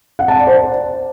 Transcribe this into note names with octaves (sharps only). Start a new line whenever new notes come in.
F#5
A5
D5
C5